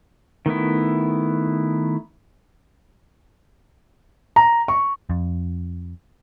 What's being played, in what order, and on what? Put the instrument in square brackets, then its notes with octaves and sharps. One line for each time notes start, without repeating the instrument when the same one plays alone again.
[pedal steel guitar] D#3 A3 B3 E4
[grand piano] A#5
C#6
[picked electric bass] F2